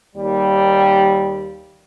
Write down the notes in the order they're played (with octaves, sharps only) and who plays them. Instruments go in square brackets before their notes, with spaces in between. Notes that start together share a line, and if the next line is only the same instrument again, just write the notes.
[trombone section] D#2 G3